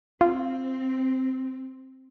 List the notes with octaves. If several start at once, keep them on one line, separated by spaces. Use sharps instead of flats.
C4 F4